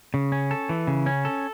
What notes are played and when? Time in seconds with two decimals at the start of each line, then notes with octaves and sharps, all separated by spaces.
0.14 C#3
0.32 C#4
0.51 A4
0.69 E3
0.87 C#3
1.06 C#4
1.25 A4